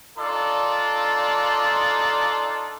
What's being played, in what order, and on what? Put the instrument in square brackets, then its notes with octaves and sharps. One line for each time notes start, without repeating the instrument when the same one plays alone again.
[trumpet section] D4 D#4 F4 A4 D5